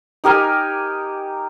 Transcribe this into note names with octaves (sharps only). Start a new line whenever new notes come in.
D#4 G4 A#4 G#5